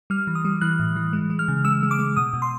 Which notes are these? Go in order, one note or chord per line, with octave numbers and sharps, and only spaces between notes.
G3 F6
E3
D#6
G3
E3 F#6
A2
E3
G#3
G#3
F6
C#3
G#3 E6
G#3
D6
G#3
B2 D#6
B2
C6